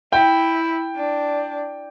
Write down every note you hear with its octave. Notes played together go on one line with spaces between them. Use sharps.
E4 G5
D4